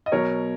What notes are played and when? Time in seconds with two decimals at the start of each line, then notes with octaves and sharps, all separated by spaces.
0.06 D#5
0.12 B2 F#3 A#4 C#5